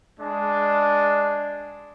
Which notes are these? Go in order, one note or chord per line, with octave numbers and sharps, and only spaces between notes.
G#3 D4